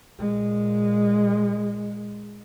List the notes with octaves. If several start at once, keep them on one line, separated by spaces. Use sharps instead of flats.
A#2 G#3